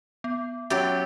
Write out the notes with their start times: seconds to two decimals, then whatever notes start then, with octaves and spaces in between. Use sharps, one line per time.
0.24 B3
0.70 F#3 C#4 F#4 G4 E5